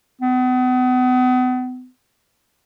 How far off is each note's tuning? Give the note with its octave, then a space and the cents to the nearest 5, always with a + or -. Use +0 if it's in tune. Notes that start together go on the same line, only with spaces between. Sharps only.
B3 +40